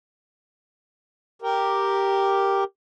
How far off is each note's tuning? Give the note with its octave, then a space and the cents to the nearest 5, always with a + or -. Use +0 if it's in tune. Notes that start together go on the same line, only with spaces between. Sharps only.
G4 +0 A#4 +0